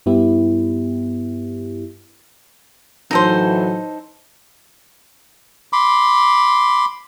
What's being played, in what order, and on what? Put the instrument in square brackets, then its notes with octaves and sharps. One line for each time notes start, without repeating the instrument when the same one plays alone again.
[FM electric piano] G2 B3 E4 G4
[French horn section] A2 E3 F#3 [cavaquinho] D#4 A4 C5
[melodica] B5 C6 D6